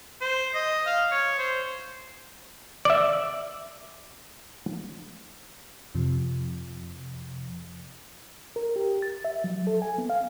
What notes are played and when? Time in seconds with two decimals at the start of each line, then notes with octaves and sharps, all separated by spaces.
0.21 C5
0.54 D#5
0.87 F5
1.12 C#5
1.39 C5
2.85 D5 E5
5.95 F2 C3 F3
8.56 A#4
8.76 G4
9.02 A6
9.25 E5
9.44 F#3
9.67 A4
9.82 G#5
9.98 B3
10.10 F5